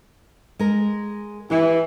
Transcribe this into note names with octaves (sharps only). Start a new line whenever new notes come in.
G#3 A#4
E3 E4 G4